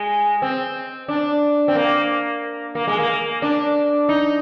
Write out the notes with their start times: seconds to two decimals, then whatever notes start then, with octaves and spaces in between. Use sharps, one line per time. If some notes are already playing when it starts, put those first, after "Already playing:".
Already playing: G#3
0.42 C4
1.08 D4
1.68 C4
1.75 A#3
2.75 A#3
2.87 G#3
2.99 A#3
3.42 D4
4.09 D#4